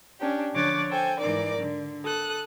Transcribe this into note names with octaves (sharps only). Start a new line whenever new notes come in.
C#4 D4 G4
D3 F3 C#5 D6 F#6 A6
A4 C5 G5 G#5
G#2 E3 D#4 A#4 D5 D6
D3
A4 D#6 F#6